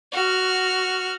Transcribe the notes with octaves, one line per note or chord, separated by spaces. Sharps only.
F#4 F6